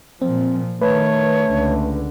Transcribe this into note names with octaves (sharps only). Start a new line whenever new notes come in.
A#2 F3 C4
D#3 A3 B4 C#5
C#2 D3